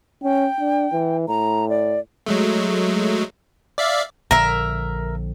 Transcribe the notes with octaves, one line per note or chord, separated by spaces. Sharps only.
C#4 G5
D4
E3
A2 A#5
D5
F#3 G#3 A3
D5 E5 F5
A#1 D3 A#4 E5